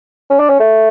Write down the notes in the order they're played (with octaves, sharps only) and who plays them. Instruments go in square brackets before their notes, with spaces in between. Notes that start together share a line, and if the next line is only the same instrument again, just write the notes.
[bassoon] C#4
D4
C#4
A3